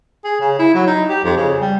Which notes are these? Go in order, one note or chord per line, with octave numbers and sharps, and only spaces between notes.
G#4
C#3
E4
F#3
D#4
G4
F2
C#3
G3